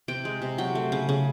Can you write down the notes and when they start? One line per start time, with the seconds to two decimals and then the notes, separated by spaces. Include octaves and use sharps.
0.08 C3 G5
0.25 G#3
0.42 C3
0.58 F#3 G5
0.75 A3
0.92 C#3
1.09 C#3